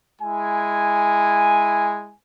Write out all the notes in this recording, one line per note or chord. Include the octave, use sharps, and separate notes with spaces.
G#3 E4 G#5